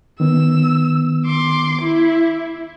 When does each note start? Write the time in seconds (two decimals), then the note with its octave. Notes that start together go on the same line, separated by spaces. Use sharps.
0.20 D#3 B3 E6
1.26 C6 D6
1.81 E4